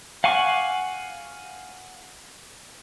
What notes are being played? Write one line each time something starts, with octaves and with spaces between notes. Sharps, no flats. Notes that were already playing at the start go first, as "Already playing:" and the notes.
F5 F#5 G#5 C#6 D6